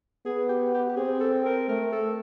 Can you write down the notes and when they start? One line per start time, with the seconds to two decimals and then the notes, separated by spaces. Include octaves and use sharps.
0.26 B3 G#4
0.49 G4
0.74 G4
0.89 G4
0.97 C4 G#4
1.20 A4
1.45 A#4
1.68 A3 A#4
1.92 A4